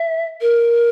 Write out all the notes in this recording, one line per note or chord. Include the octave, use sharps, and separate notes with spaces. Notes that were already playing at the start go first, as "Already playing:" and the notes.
Already playing: E5
A#4